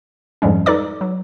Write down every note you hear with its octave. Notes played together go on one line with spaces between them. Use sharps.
F2 G#2 F3 G3 G#3 C#4
D#4 A4 B4 D5 D6
F#3